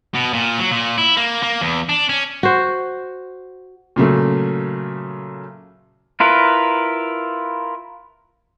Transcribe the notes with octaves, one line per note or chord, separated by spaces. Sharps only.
B2
A#2
F#3
A#2
E4
A#3
A#3
E2
D4
C#4
F#4 C5
A#2 C#3 F#3 A3
E4 F4 A#4 B4